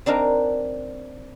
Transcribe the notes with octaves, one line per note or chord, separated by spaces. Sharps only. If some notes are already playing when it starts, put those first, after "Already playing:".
C4 D4 D#4 A#4 A#5